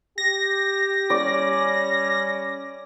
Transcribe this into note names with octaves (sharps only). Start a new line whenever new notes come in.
G4 A#6
G3 C#4 D5